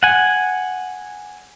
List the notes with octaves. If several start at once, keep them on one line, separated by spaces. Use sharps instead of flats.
F#5 G#5